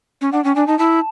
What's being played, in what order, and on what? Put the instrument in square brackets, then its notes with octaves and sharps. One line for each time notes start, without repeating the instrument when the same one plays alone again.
[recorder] C#4
[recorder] D4 [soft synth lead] F#5
[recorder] C#4 [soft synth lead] G5
[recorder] D4 [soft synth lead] G#5
[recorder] D#4 [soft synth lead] A5
[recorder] E4 [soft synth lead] A5